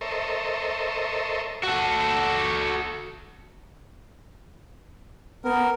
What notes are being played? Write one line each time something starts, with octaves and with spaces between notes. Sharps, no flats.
A4 A#4 C5 C#5 D#5 E5
F#4 A4
B3 A#4